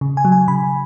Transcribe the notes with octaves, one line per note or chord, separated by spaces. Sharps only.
C#3
G#5
F#3
G#5
C#3 B5